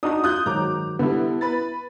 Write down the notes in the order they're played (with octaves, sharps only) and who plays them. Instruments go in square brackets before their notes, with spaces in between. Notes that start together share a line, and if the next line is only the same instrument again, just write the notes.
[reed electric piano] D4 D#4 F#4 [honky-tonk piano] D#6
[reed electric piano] F4 [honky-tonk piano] D#6 F#6 G6
[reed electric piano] G#2 D#3 F#3 [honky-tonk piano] A#5 D6
[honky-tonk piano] D3 G3 [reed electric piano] B3 E4
[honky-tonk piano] B4 B5 A6